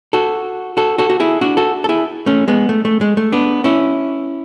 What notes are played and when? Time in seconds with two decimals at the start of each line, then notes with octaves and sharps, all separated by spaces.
0.13 F#4 A4
0.77 F#4 A4
0.98 F#4 A4
1.10 F#4
1.20 E4 G#4
1.41 D4 F#4
1.57 F#4 A4
1.84 A4
1.89 E4 G#4
2.26 A3 C#4
2.48 G#3 B3
2.69 A3
2.85 A3
3.01 G#3
3.17 A3
3.32 B3 D4
3.64 C#4 E4